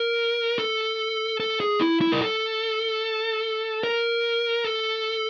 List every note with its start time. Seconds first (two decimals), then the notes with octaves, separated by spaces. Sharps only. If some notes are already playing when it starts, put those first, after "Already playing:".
Already playing: A#4
0.59 A4
1.40 A4
1.60 G#4
1.81 E4
2.01 E4
2.12 A#4
2.21 A4
3.83 A#4
4.65 A4